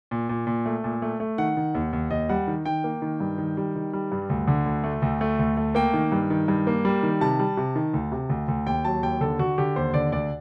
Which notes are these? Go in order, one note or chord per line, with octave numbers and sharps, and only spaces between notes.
A#2
A#2
A#2
A3
A#2
A3
A3
D#3 F#5
D#3
D#2
D#2
D#2 D#5
G3 F#5
D#3
D#3 G5
A#3
D#3
G2
D#3
G3
D#3
G3
G2
D2
D3
D2
A3
D2
A3
D2
A3
A#3 G5
D#3
G2
D#3
G2
A#3
G3
D#3
C3 A5
G3
C3
D#3
D2
C3
D2
D2
D#2 G5
F#3 A5
D#2 G5
D3 A4
D3 F#4
D3 G4
D#2 C5
D3 D5
D2 D5